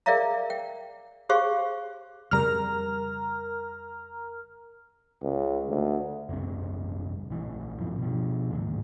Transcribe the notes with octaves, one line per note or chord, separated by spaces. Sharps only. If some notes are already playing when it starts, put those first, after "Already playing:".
G#4 A#4 D5 E5 F5 A#5
G5
G4 G#4 C5 F5 C6 C#6
F2 C#3 G3 A#4 A#5 F6
C#2
D2
F#1 C2 C3
A#1 E3
A1 G2 F3
B2 F3
G#1 D#2 A2